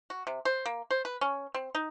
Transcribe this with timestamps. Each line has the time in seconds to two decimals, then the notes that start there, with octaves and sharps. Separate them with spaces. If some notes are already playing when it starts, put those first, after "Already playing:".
0.10 F#4
0.27 C3
0.45 C5
0.66 A#3
0.90 C5
1.05 B4
1.21 C#4
1.54 C4
1.75 D#4